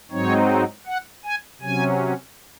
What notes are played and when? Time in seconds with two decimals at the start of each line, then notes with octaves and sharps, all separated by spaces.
0.11 G#2 F#3 C4 D#4 C#5
0.86 F#5
1.24 G#5
1.61 C3 F#3 C#4 G#5